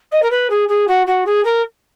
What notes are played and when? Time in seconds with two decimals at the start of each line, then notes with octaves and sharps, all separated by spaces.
0.11 D#5
0.22 A#4
0.30 B4
0.50 G#4
0.68 G#4
0.87 F#4
1.06 F#4
1.25 G#4
1.44 A#4